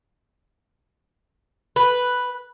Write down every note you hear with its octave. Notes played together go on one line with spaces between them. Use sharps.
B4